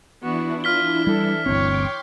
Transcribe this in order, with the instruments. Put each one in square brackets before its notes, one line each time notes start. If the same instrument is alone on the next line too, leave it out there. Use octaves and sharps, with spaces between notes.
[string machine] E3 D4 E4 [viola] B3 F#4
[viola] F4 [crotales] F6 B6 G7
[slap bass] G3 [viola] A4
[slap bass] G1 D2 C4 [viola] C#5 [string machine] G5 C6 D6